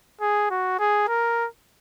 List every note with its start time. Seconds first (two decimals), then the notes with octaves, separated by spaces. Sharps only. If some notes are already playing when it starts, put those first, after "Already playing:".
0.21 G#4
0.50 F#4
0.79 G#4
1.08 A#4